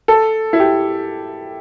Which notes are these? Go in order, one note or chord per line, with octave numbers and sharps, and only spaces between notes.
A4
E4
G4